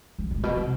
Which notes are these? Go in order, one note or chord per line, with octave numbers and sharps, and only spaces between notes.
F2
A2
B2
C3